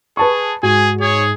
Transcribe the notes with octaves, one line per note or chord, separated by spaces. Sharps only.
G#4 B4 A5 C#6
G#2 F#4 G#4 G#5
G#4 C#5